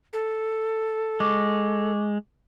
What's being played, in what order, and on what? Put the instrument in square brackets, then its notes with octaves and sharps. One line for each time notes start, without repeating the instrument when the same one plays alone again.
[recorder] A4
[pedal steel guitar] G#3 [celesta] C#6 D6